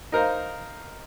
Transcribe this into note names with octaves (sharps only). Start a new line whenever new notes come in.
D#4 A#4 C5 F5